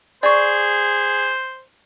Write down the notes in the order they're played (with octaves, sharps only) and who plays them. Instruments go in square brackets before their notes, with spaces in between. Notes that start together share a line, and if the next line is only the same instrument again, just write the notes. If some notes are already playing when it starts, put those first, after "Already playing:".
[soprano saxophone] G#4 [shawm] C5 [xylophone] D5 C#6